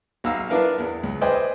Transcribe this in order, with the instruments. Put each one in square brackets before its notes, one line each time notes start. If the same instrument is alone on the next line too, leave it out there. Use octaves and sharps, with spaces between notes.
[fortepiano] B1 F5 A#5 E6
B3 D4 E4 A#4 B4 F5
E2
C#2
B4 C5 D5 D#5 G5 G#5